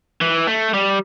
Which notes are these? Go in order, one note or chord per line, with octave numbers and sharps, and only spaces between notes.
E3
A3
G3